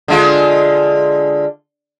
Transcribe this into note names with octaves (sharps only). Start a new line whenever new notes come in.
D3 G#3 F4